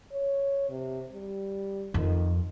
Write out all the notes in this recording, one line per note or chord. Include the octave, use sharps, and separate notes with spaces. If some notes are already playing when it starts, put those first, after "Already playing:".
C#5
C3
G3
F2 D#3